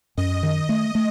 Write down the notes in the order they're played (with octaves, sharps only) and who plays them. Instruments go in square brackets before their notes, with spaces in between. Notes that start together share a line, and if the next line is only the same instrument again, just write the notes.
[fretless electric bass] F#2 [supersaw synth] D#5
[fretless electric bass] D#3
A3
A3